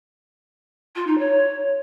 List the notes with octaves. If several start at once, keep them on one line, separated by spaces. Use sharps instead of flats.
F4
D#4
C#5